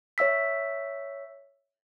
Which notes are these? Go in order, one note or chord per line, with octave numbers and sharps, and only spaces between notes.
C#5 E5 E6 B6